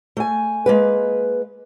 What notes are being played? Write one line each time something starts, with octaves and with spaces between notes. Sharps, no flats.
A3 G#5
G#3 A#3 B4